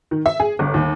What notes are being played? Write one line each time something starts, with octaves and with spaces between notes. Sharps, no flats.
D#3
E5
G#4
G1
D#2